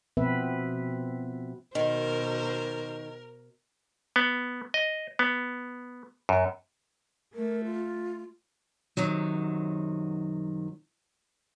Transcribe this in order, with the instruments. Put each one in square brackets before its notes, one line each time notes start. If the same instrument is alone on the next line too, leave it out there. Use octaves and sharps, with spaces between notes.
[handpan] B2 F3 B3 C4 B4 E5
[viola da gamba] B2 C5 [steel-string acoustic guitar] D#3 [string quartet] A#4
[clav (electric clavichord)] B3
D#5
B3
F#2
[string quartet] A3 [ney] A#4
[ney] F4
[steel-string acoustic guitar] F#2 C3 D#3 F#3